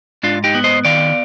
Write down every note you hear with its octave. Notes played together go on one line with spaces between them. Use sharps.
G#2 D4 F4
D#4 G4
B3
C5 D#5
D#3 D5 F5